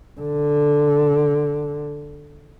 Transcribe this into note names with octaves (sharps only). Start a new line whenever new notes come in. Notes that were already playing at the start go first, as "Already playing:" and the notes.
D3